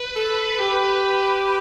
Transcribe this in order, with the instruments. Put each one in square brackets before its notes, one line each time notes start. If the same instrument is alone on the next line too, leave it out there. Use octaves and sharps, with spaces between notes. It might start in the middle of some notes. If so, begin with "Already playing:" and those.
Already playing: [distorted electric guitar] B4
[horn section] A4
G4